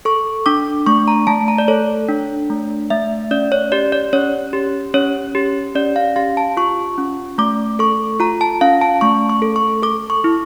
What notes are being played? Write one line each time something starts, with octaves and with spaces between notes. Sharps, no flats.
A4 C#6
D4 D6
A3 C#6
A#5
A3 A5
A#5
D5
A4 C#5
D4
A3
A3 E5
C#4 D5
C#5
G4 D5
D5
C#4 C#5
G4
C#4 C#5
G4
C#4 D5
F5
G4 F5
A5
F4 C#6
C#4
A3 D6
A4 C#6
F4 A#5
A5
C#4 F5
A5
A3 C#6
C#6
A4
C#6
A4 D6
C#6
E4